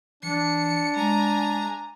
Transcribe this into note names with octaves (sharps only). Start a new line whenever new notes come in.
E3 D4 C#7
G#3 G#5 A#5